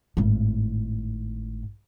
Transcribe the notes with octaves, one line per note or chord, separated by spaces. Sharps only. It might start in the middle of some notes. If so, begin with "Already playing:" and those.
G#1 A2